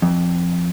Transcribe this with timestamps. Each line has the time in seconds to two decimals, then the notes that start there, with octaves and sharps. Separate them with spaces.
0.02 F2